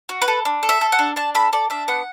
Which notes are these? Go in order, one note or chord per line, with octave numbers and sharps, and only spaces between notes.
F#4
B4
A4
D4
A4
E5
A4
F#5
D4
D4 A5
A4 B5
A4 D5
D4 E5
B3 F#5